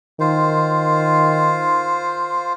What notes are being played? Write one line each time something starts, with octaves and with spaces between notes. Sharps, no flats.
D#3 F4 C5